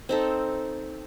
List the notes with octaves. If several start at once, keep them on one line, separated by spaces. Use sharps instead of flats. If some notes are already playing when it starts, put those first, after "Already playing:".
C4 D#4 A4